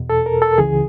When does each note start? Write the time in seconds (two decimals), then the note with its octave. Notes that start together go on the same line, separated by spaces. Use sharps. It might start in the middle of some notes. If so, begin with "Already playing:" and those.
Already playing: E2 B2
0.10 A4
0.26 A#4
0.42 A4
0.58 C#2 C#3 E3 G#4